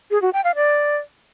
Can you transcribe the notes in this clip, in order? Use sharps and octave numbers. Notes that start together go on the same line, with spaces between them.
G#4
F#4
G5
F5
D5